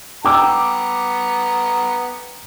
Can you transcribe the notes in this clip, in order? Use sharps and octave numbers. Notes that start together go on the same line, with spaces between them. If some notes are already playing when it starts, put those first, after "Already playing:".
B3 G5 A#5 D6 E6